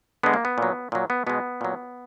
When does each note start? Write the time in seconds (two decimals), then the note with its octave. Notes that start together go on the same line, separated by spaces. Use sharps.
0.23 D3 G#3 B3
0.34 A#3
0.45 B3
0.58 A#2 F#3
0.92 A#2 F#3
1.10 B3
1.27 B2 G#3 B3
1.61 A#2 F#3